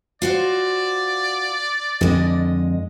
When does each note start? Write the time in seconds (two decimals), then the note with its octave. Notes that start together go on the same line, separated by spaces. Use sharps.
0.22 F4 F#4 C5 D5
2.01 F2 D3 G#3 D#5